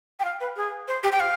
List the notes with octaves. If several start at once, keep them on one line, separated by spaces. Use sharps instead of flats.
G5
F5
B4
G#4
C5
G4
G5
F5